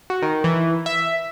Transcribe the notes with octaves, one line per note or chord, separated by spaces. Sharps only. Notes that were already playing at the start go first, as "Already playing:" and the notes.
F#4
D#3
E3
E5